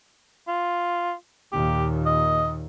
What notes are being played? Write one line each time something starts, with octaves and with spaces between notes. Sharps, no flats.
F4
D#2 A#2 G4
D#5